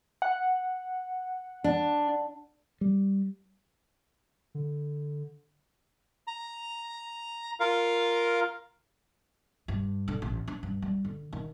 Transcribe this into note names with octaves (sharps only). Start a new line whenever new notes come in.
F#5
D4
G3
D3
A#5
F4 A#4 F5
G2
D3
A1
D4
G2
G3
D3
D#3